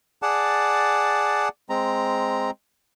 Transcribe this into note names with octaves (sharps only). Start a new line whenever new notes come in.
G#4 D5 F#5 A5
G#3 C4 A#5